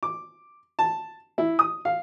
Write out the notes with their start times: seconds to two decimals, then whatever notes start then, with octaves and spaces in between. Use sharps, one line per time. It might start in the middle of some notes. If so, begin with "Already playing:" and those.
0.03 D6
0.79 A5
1.38 E4
1.59 D#6
1.85 F5